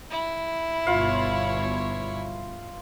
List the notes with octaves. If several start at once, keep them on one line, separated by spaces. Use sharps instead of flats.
E4
G1 B2 F4 C#5 F5